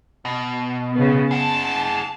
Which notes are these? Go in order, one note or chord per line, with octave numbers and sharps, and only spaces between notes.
B2
C#3 B3
G#4 F#5 A5